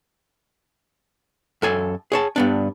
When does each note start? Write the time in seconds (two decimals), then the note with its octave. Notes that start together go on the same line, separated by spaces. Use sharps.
1.62 F#2 A4 G#5
2.12 G#4 C#5 A5
2.36 G2 B3 D4